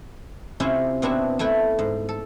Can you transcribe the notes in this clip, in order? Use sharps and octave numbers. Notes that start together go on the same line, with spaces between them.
C3 C#4 E4 F4 C5
B2 B3 C4 D4 E4 F#4
A3 E4 B4 G5
G#2
A4